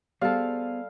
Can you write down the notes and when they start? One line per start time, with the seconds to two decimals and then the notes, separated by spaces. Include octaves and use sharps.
0.21 G3 B3 G#4 A4 C5 F5